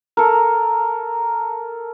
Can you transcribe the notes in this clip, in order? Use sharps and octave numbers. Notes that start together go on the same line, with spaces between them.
A4 A#4